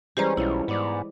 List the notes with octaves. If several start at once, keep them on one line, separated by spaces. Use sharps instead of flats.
E3 G3 G#3 C#4 G4 C5 A#5
B1 C#4 E4 F4
G#2 B3 D5